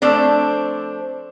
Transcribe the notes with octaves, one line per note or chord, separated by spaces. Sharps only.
F3 A3 C4 D4